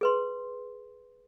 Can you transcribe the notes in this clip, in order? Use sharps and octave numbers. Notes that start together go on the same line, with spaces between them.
G#4 B4 C6